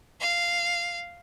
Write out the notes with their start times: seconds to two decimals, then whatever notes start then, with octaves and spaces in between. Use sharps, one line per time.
0.21 F5